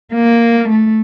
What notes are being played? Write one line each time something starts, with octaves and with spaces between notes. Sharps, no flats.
A#3
A3